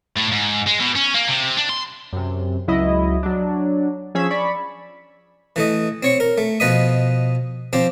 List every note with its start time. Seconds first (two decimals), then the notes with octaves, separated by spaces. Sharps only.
0.16 A2
0.31 G#2
0.67 G#3
0.80 B2
0.96 C#4
1.14 A#3
1.28 C3
1.57 D4
1.69 C6
2.13 F#2 C3
2.67 C#2 F#3 E4 D#5
3.23 F#3 D4
4.15 F3 C#4 G#4 E6 G#6 B6
4.30 D5 B5 C#6
5.56 E3 A3 D#5
6.03 C4 C#5 C#6
6.20 A#4
6.38 A3
6.60 B2 F3 B4 D#5 B5 D#6
7.73 F3 C4 G4